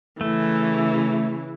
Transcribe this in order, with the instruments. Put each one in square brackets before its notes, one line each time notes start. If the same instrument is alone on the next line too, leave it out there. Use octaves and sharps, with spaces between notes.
[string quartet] C#3 E3 [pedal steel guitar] A3